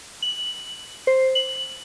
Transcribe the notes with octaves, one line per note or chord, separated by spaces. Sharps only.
F#7
C5
F#7